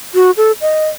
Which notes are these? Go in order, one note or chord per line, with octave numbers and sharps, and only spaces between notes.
F#4
A4
D#5